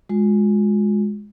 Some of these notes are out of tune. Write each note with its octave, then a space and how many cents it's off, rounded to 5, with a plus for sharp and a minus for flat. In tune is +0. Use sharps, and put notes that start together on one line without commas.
G#3 +0 F4 +45